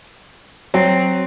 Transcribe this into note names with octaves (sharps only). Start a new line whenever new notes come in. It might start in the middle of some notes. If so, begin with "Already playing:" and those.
F#3 C4